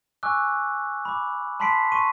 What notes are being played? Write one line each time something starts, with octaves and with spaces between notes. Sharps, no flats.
G#5 C#6 D6 E6 F#6
B5 D6
A5 B5 C6 B6 C7 D7
C6 C#6 D#7